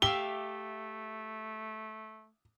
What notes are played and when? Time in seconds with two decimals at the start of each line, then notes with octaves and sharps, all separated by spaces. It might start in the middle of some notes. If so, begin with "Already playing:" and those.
0.02 A3 G4 E5 F5 G7